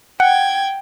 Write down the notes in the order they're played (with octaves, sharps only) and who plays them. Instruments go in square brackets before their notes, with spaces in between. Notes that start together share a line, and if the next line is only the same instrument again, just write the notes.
[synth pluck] F#5 [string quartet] G5 G#6